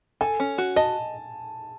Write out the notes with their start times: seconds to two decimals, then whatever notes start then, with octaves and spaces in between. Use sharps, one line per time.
0.21 A4 G#5
0.40 C#4
0.58 F#4
0.76 D#5 A5